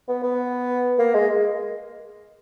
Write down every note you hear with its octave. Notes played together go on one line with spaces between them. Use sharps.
B3
B3
A#3
G#3